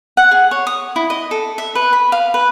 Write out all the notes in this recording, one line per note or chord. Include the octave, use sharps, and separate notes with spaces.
F#5
G#4
C#5
D#6
E4
D#5
A4
E5
B4
B5
F5
B4